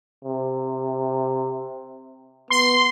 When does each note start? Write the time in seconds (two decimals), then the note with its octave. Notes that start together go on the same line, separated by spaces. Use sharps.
0.25 C3
2.50 B3 C6